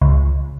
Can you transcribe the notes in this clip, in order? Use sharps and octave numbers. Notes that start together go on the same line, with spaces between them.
C#2